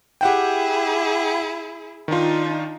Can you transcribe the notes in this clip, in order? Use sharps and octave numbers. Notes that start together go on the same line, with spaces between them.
E4 G4 G#4 F#5 G5
D#3 D4 D#4 F4